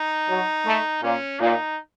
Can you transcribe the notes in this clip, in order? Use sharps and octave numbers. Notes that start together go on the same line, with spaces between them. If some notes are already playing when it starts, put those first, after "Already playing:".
Already playing: D#4
F#3
A3
A#2 C#4
A#2 D#4